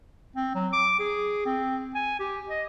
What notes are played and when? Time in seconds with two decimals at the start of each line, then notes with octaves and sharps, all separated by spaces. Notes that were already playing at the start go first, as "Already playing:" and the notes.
0.36 C4
0.55 F#3
0.73 D6
1.00 G#4
1.46 C4
1.95 G#5
2.19 G4
2.49 D#5